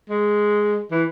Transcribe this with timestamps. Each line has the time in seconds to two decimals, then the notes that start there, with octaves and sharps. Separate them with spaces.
0.10 G#3
0.91 E3